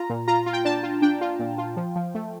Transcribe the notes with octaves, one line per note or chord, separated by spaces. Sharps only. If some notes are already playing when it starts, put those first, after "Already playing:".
Already playing: F4 A#5
A#2
F4 A#5
F4
G5
D4 A5
F4
D4 G5
F4
A#2
F4
F3
F3
A3